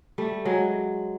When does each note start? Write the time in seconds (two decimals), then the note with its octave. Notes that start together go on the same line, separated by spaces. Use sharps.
0.18 G3 A3
0.45 F#3 G#3